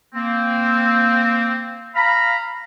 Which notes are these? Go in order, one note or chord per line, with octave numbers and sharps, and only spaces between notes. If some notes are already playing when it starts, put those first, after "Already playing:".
A#3 C4
F5 A#5 B5